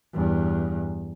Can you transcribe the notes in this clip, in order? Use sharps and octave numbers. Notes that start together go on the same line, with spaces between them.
E2 G2